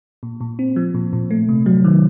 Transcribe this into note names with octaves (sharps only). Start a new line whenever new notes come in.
A#2
A#2
C4
F3
A#2
A#2
A3
C3
F#3
D#3